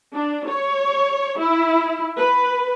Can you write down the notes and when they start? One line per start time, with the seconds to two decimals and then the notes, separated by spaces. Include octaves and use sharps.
0.14 D4
0.48 C#5
1.39 E4
2.18 B4